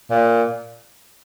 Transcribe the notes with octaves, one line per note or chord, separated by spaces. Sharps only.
A#2